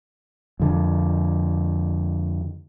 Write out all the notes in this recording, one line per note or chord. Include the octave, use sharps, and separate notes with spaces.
F2 D3